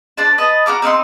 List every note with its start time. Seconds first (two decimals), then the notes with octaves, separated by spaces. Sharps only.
0.17 D4 C5 D5 A5
0.38 B4 D#5 A5
0.66 F#4 A#5 D6 F6
0.82 C4 D#4 F#5 C6